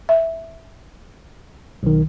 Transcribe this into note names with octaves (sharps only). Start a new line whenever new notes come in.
E5
B1 D#3